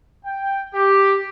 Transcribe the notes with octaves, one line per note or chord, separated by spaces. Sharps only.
G5
G4